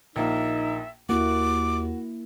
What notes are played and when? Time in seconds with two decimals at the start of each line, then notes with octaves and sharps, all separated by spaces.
0.16 A#1 A#3 D#4 E5
1.09 D#2 A#3 E4 F#4 D6